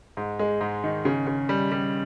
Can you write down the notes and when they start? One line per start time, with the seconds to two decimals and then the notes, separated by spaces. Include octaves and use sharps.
0.17 G#2
0.39 G#3
0.61 G#2
0.84 D#3
1.05 C#3
1.27 C#3
1.49 G3
1.72 G3